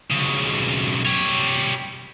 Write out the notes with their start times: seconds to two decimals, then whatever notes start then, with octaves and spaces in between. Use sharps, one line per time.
0.11 B1 C#3
1.05 G3 C#5